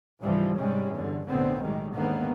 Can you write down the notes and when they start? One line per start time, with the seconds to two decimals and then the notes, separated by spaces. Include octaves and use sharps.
0.22 C#2 G#2 E3 F3 G3
0.57 G#2 C3 G3 G#3 C#4
0.92 E2 G2 D3
1.28 B1 F#2 A2 D3 B3 C4
1.61 A2 D#3 G3 G#3
1.94 D#2 G#2 D3 D#3 A#3 B3